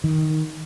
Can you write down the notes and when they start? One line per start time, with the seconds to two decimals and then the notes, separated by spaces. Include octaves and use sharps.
0.04 D#3